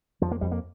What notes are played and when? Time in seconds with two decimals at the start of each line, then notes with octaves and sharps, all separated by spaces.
0.21 F2 F3
0.31 A#3
0.41 F2 G3
0.52 A#3